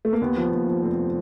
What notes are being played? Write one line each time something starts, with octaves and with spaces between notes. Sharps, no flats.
A3
A#3
D#2 B3
F3
D#2
F3
F1 C4